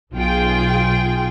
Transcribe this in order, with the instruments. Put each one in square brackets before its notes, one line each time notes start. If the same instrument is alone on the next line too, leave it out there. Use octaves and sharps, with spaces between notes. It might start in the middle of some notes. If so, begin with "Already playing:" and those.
[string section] B1 F4 G#4 G5